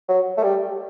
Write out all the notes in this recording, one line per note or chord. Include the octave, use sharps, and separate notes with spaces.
F#3
A3
G3